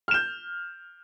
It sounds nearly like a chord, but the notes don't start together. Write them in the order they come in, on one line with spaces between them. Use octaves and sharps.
F6 E7 G6